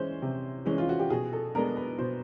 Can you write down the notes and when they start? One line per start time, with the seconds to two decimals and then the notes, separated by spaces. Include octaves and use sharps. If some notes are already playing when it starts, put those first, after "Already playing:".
Already playing: E3 G#3 C#4 C5
0.22 C3
0.66 E3 G#3 C#4
0.78 F4
0.89 F#4
0.99 G4
1.10 B2 G#4
1.33 A4
1.55 G#3 B3 D4 A#4
1.77 B4
1.98 B2 C5